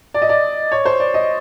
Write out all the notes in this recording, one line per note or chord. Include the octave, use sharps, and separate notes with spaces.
D5
D#5
D5
C#5
C5
D5
D#5